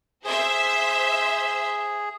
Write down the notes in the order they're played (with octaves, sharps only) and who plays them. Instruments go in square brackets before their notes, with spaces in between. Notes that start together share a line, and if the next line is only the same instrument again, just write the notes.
[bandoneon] G#4 [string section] C5 E5